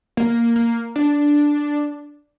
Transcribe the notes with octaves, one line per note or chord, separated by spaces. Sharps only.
A#3
A#3
D4